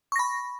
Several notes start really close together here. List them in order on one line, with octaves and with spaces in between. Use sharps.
C#6 A#6 B5